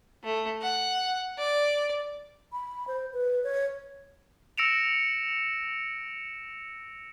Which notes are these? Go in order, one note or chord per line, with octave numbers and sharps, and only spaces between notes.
A3
F#5
D5
B5
C5
B4
C#5
E6 A#6 C#7 D7 E7 F7